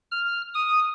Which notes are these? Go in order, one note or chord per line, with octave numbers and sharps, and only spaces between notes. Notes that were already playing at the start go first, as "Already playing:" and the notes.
F6
D#6